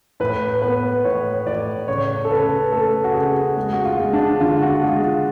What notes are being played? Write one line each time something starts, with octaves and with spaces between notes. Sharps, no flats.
A2 B4
B3 B4
A2 C#5
A2 D5
C#3 C#5
A4
C#3 B4
A3 A4
F#4
C#3 G#4
G#3
F#4
F4
G#3
D4
D3 F4
F4
F#4
G#3 F4
F4